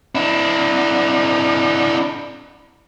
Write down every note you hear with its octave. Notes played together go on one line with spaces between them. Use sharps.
D4 E4